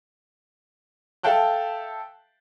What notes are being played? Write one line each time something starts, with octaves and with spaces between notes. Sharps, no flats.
A4 E5 F5 G5 A5 F#6